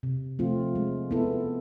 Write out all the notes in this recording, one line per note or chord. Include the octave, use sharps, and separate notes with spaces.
C3
F3 A3 C4 F4
G#3
B3 E4 A4